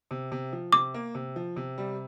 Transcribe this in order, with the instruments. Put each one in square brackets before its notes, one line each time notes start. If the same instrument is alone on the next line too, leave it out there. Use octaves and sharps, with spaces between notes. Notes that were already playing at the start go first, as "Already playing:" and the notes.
[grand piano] C3
C3
F3
[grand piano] C3 [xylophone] D6
[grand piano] A#3
C3
F3
C3
G3